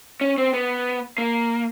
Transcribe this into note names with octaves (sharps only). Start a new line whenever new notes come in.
C#4
C4
B3
A#3